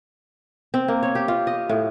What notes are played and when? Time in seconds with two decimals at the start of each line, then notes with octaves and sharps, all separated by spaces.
0.74 C4
0.88 A#3
1.03 C#5
1.15 G4
1.28 F4
1.47 D#5
1.69 A2